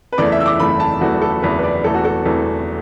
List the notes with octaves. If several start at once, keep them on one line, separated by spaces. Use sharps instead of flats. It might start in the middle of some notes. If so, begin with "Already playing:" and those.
B4
F#1 E2 E3 A3 D5
E5
E6
D6
F#1 E2 E3 A3 B5
A5
F#1 E2 E3 A3 F#4
A4
F#1 E2 E3 A3 B4
B4
D5
E1 E2 E3 A3 A4
F#4
A4
E1 E2 E3 A3